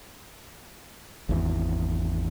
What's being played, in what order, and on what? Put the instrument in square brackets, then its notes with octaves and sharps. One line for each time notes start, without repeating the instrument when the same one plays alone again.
[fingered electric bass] G#1 E2